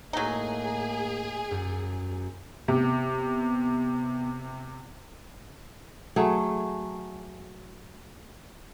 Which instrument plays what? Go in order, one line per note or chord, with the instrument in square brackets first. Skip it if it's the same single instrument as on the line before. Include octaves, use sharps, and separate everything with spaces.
[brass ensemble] A2 A#3 [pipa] F#3 D#4 [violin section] G#4
[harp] F#2
[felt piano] C3 [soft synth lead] B3
[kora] F#3 A3 G#4